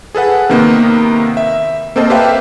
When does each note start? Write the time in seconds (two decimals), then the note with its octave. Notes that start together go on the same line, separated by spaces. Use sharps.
0.15 G#4 A4 B4 F#5
0.50 C3 D#3 A#3 B3
1.37 E5
1.96 A#3 C4 A4 C5 D#5 A5
2.10 G4 B4 C5 E5 F5 G5